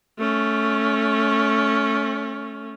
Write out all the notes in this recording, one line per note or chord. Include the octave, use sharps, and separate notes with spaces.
A3 C#4